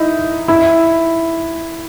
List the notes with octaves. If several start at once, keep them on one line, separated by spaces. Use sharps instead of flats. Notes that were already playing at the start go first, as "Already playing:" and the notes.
Already playing: D#4 E4
E4